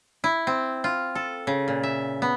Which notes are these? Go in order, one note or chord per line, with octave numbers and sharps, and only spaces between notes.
E4
C4
F4
A4
C#3
A#2
E5
B3